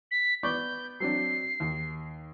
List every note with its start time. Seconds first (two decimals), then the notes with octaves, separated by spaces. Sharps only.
0.11 B6
0.43 B3 D5 C#6 G6
1.00 F#3 C4 D4 C7
1.60 D#2